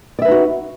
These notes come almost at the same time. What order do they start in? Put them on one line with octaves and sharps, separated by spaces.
D5 E5 B4 D#4 F#4